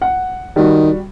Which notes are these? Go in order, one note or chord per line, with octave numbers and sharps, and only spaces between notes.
F#5
D#3 G3 F#4